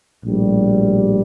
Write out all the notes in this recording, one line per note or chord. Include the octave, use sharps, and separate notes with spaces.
A#1 A2 G3